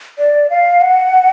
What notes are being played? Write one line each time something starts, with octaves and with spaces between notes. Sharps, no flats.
D5
F5
F#5